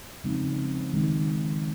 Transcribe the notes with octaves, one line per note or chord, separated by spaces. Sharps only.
C#3 F3 G#3 C4 D#4
D#3 G#3 C4 D#4